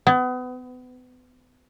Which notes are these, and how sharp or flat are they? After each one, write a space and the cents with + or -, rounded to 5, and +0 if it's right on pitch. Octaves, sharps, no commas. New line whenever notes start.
B3 +30